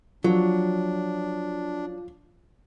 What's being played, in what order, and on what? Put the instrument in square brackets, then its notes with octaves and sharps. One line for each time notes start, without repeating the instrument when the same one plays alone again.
[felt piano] F3 [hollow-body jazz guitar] F#3 [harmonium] D4